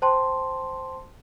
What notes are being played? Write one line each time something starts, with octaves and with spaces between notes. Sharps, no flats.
C5 G5 A5 C6